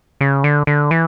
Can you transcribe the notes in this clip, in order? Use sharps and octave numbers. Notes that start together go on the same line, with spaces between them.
C#3
D3
D3
E3